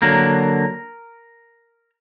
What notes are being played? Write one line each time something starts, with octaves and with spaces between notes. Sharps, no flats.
D3 F#3 A#3 A#4